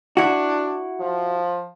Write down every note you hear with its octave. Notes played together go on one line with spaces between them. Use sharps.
D4 E4 F#4
F3